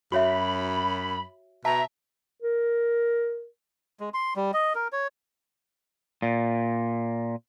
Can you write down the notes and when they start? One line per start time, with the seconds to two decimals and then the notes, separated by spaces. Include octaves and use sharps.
0.12 F#2 F#4 C#5 E5 B5
1.65 B2 E5 A5 A#5
2.42 A#4
4.00 G#3
4.14 C6
4.36 G3
4.54 D#5
4.75 A#4
4.92 C#5
6.22 A#2